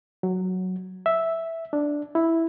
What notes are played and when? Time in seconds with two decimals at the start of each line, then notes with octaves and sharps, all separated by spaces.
0.23 F#3
1.06 E5
1.73 D4
2.15 E4